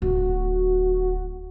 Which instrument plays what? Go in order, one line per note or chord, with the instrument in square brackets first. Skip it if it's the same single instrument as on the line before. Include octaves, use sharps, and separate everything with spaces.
[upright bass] D1 [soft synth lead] F#4